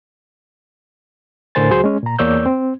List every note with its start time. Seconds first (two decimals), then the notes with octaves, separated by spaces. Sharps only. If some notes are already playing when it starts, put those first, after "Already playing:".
1.55 A2 D3 A#4 C5 G#5 A6
1.70 C#2 F#3 F#4 G#4 C5
1.84 G#3 C#4
2.03 A#2 A#5
2.19 E2 A#3 C#5 D5 E6 G6
2.46 C4